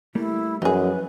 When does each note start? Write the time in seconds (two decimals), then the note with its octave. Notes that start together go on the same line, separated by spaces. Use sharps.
0.15 G3 A3 A#3 E4
0.62 F#2 F3 F#3 D#4 G#4 B4